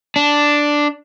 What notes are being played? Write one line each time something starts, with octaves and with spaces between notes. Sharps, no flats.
D4